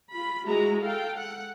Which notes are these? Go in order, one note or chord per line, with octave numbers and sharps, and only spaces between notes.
F4 B5
G#3 E4 F#4 A#5
A4 F5 G5
F#5